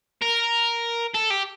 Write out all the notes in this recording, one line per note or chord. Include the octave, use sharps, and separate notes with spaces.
A#4
A4
G4